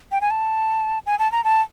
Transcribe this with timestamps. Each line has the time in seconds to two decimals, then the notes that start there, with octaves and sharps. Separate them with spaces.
0.12 G5
0.21 G#5
0.31 A5
1.06 G#5
1.19 A5
1.32 A#5
1.44 A5